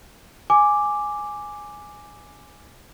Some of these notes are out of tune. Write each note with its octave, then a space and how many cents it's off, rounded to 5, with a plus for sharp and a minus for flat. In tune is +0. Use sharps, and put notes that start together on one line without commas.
G#5 +0 D6 +0